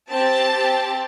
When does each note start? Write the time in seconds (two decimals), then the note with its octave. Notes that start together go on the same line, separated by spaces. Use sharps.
0.11 C4 G4 A5
0.53 C4 G4